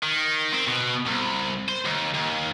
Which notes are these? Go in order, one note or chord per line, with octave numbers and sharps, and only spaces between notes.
D#3
C4
B2
C2
C5
D#2
D#2